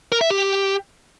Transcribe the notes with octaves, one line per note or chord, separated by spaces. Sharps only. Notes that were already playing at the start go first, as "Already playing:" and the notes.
A#4
E5
G4